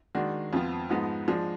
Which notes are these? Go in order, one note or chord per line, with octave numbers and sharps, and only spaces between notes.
D#3 G#3 D4 F#4
F2 F3 B3 F4
G#2 F3 G#3 B3 D#4
F3 G#3 D4